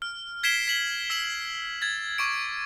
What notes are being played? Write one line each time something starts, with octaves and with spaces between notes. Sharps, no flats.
F6
G#6 B6 C7 D7 E7 G7
B6 F#7 G7
E6 B6 E7 F#7
G#6 A6
C#6 D6 D7